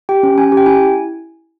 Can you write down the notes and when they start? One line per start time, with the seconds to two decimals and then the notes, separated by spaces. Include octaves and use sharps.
0.09 G4 G5
0.23 C#4
0.38 C#4 G#5
0.52 G4
0.57 G5
0.66 E4 G#5